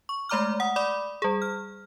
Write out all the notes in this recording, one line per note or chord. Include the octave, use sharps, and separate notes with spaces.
C#6
G#3 A3 D5 A#5 D6 F6
F#5 D#6
D5 B5 D6 D#6
G3 G#4
F6